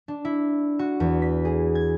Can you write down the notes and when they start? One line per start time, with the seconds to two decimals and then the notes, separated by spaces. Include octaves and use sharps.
0.08 D4
0.25 E4
0.79 F#4
1.00 E2
1.22 B6
1.45 G#4
1.75 G#6